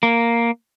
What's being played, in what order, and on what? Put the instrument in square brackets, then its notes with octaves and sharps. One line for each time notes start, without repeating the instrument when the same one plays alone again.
[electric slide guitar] A#3